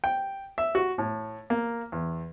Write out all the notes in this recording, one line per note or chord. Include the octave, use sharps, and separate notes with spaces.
G5
E5
F#4
A2
A#3
E2